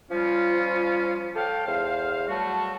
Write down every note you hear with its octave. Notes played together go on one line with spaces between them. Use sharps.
F3 G3 C#4 F4
A4 C#5 F5 G5
E2 C5 F5
F#3 G3 A3 F#4 A5